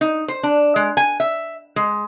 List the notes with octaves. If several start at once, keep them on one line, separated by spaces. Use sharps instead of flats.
D#4
C5
D4
G#3
G#5
E5
G#3